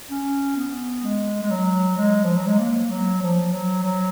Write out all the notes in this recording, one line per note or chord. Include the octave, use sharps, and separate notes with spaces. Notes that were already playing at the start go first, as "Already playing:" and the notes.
C#4
B3
G#3
G#3
F#3
G#3
F3
F#3
G#3
A#3
F#3
F3
F#3
F#3